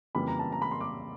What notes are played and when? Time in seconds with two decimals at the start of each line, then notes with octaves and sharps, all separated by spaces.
0.15 F2 C#3 E3 G3 A#3 B5
0.28 A#5
0.39 A5
0.52 A#5
0.62 B5
0.71 C6
0.81 D6